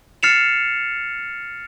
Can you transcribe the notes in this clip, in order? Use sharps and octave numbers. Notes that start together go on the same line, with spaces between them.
F6 A6 C7 C#7 E7 F7